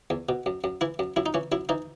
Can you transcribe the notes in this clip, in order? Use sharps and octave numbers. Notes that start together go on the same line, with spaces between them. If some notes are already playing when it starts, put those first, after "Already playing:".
E2
B2
F#2
F#2
E3 E4
F#2
F#2 E4
D#4
E3 C#4
F#2 E4
E3 D#4